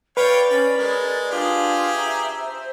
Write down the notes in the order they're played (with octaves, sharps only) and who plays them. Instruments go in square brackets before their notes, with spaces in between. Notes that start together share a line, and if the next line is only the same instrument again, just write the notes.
[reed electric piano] B4 [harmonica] C#5 F5 G5 [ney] D5
[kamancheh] C#4 [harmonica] B5
[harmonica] G#3 [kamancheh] A#4
[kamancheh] D4 F4 [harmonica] G4 G#4
[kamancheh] E5 [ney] A#5
[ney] C5